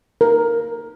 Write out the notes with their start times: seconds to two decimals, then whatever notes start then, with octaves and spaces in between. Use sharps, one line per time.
0.21 A#4